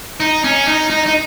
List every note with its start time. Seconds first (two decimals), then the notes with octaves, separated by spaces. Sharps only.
0.20 D#4
0.44 C#4
0.68 D#4
0.90 D#4
1.06 D#4